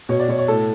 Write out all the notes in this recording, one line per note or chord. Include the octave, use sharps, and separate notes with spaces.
B2 C#5
D5
B2 C#5
C#5
A2 A4